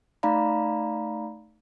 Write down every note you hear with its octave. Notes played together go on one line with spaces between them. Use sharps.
A3 D#4 D5 F5 A#5 B5